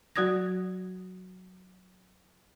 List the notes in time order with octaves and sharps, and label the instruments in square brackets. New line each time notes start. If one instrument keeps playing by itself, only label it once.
[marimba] F#3 F#4 D5 D#6 G#6 A#6